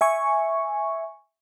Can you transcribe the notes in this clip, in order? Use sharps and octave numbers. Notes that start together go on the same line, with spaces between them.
E5 G#5 C#6